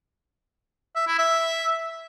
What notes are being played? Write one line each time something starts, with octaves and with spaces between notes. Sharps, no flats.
E5
E4
E5